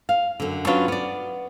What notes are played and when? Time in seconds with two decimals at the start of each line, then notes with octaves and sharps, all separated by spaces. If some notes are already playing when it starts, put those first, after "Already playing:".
0.09 F5
0.40 F#2 D3
0.67 F#3 C#4 D4 F4 F#4 B4
0.88 B3 D5